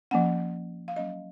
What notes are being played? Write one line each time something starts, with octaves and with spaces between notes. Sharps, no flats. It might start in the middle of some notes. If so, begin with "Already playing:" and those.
F3 A#3 C#4 F#5
F5
F#3 A#3 C#4 D#5